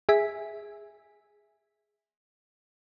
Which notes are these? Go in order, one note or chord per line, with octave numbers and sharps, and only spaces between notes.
G#4 E5 G#5 B6